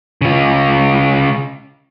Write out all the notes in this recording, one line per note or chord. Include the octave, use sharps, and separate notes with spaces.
C#3 F4